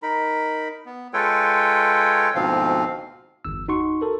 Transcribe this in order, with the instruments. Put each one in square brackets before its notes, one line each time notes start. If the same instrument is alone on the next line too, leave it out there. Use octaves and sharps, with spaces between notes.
[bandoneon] D#4 A#4 B5
B3
G#3 F4 A4 B4 C#5 G5
D2 G#2 B2 F3 C4 F5
[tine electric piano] G1 E2 E6
D#4 F#4 C6 C#6
A4 A#4